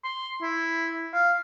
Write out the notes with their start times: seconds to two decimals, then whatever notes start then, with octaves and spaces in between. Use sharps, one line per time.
0.04 C6
0.42 E4
1.14 F5